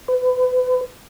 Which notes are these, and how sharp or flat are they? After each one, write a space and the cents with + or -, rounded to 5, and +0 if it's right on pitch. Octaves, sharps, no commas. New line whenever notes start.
B4 +35